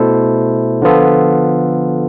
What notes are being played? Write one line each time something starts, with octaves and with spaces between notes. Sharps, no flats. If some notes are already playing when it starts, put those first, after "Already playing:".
Already playing: B2 A3 E4 A4 C5
D3 F3 B3 F4 A4